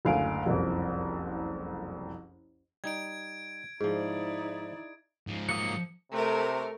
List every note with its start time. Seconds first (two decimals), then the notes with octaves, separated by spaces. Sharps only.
0.05 F#1 D2 F5 G#5 D7
0.46 F#1 C2 F2
2.84 G3 D#4 G#6 D7
3.81 G#2 F3 D#4 E4 G#4 D5
5.27 G#2 F3
5.49 F#3 A#3 D#6 C#7
6.12 C3 A3 A#4